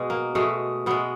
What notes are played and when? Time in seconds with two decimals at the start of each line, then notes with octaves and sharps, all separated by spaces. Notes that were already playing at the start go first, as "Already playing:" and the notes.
Already playing: B2 G#3
0.10 A#3
0.35 B2 G#3 A3
0.86 B2 G#3 B3